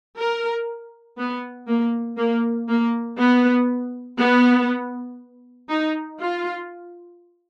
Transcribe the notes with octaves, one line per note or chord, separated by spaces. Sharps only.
A#4
B3
A#3
A#3
A#3
B3
B3
D#4
F4